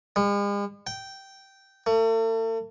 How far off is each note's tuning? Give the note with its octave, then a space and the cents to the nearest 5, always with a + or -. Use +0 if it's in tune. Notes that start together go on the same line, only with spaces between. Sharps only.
G#3 -45
G5 -10
A3 +40